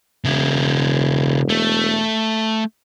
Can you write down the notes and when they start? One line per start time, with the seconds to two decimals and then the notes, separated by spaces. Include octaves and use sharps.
0.25 E1 C#3 E4
1.49 A3